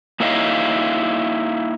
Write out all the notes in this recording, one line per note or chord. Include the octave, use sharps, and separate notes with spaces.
A#3 D#4 E4 C#5 D#5 F5